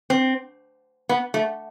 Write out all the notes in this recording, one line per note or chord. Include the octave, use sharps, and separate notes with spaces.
C4
B3
A3